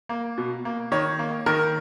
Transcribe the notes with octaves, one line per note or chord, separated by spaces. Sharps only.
A#3
B2
A#3
D#3 C#5
A#3
D#3 A#4